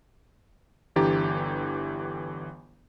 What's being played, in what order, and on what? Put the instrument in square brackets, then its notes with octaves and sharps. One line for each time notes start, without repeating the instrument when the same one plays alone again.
[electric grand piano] G1 D3 E3 G4 A#5 A6